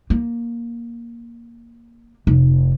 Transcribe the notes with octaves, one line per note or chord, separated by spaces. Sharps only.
A#3
F1